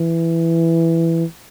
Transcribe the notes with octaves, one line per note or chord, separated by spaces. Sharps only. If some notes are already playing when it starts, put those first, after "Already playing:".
Already playing: E3